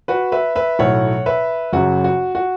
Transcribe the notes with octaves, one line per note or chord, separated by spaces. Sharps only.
F#4 B4
B4 E5
B4 E5
B1 A2 F#3 C#5 F#5
B4 E5
F#1 F#2 F#3 F#4
F#4
F#4